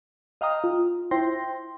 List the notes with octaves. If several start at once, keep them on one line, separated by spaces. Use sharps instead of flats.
D#5 F5 G5 A#5 D#6
F4
E4 C5 G5 C6 A#6